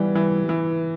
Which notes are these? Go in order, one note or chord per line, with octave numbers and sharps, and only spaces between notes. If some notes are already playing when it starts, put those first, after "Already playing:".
Already playing: E3 G3 B3
E3
E3